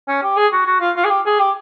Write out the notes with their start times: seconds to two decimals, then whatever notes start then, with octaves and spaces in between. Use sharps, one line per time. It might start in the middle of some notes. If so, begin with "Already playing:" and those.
0.08 C#4
0.23 G4
0.37 G#4
0.53 F#4
0.66 F#4
0.81 F4
0.96 F4
1.05 G#4
1.10 G4
1.26 G#4
1.40 G4